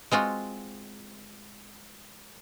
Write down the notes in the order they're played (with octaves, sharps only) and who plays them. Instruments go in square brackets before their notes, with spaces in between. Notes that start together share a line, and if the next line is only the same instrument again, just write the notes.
[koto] G#3 C4 F4 F#4